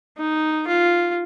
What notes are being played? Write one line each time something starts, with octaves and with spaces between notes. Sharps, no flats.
D#4
F4